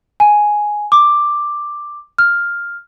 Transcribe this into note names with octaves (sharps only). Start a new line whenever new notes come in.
G#5
D6
F6